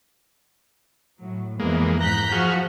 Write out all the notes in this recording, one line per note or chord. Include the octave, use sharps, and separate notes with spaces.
A2 F#3
F2 E3 G#3 A#3 B3
G#2 A#5 F#6 G6 B6
F3 F#4 G#4 F#5 F6